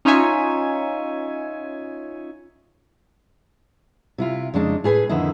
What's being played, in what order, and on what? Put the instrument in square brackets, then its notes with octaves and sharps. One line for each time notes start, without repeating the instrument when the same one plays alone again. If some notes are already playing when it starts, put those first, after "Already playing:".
[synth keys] C#4 D#4 F4 C#5 E5 G#5
[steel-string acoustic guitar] C3 E4 F4
F2 C#3 G#3 D4 D#4
A2 G#4 B4 G#5
F2 D3 D#3 D#4 E4